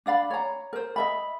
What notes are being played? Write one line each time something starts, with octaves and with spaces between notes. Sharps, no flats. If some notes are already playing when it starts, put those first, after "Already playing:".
D4 D5 F5 B5
C#5 A#5
A#4 C5
D#5 E5 B5